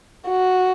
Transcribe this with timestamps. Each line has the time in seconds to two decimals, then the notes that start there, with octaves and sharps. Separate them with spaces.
0.28 F#4